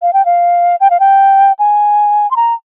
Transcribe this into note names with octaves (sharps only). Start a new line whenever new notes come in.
F5
G5
F5
G5
F5
G5
G#5
C6
A#5